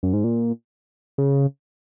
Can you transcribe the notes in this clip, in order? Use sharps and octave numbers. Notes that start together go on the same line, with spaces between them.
F#2
G#2
A#2
C#3